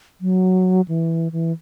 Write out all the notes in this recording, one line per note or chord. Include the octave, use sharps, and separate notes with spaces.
F#3
E3
E3